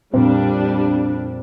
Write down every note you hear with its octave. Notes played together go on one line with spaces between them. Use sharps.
F2 A#2 G3 C4 D4